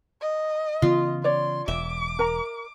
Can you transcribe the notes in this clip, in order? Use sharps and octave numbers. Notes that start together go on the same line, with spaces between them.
D#5
C#3 E3 B3 F4
C#5 D5 C6
E1 E5 D6
A#4 A#5